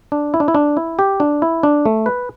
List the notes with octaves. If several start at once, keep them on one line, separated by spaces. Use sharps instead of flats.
D4
E4
D4
E4
D4
E4
G4
D4
E4
D4
A3
B4